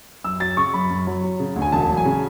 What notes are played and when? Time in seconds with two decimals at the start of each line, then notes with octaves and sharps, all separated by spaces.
0.24 F#2 E6
0.40 F#3 A6
0.57 C#3 C#6
0.74 F#2 B5
0.91 F#2
1.07 F#3
1.24 F#3
1.40 C#3
1.56 D2
1.62 G#5
1.72 E1 A5
1.89 F#3
1.97 G#5
2.05 C#3